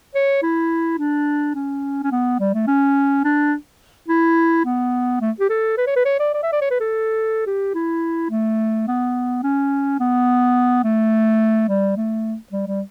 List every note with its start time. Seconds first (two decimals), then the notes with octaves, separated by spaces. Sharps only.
0.15 C#5
0.42 E4
0.99 D4
1.55 C#4
2.03 C#4
2.12 B3
2.40 G3
2.54 A3
2.67 C#4
3.24 D4
4.09 E4
4.65 B3
5.21 A3
5.40 G4
5.50 A4
5.77 B4
5.87 C#5
5.96 B4
6.05 C#5
6.20 D5
6.34 D5
6.43 E5
6.52 D5
6.62 C#5
6.71 B4
6.80 A4
7.46 G4
7.74 E4
8.30 A3
8.87 B3
9.43 C#4
10.00 B3
10.84 A3
11.68 G3
11.97 A3
12.52 G3
12.67 G3